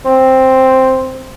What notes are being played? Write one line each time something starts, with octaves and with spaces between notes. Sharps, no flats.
C4